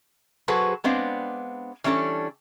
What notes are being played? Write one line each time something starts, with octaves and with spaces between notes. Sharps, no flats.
F#3 F#4 G#4 A4 B4 C5
G#3 B3 C4 D4 F5
E3 G3 C#4 D4 A4